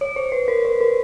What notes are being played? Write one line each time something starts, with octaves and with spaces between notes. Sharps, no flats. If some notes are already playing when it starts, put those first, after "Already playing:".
C#5
C5
B4
A#4
B4
A#4